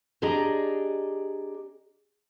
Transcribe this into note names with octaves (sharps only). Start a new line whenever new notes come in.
D4 G4 G#4 D5 D#5 A#5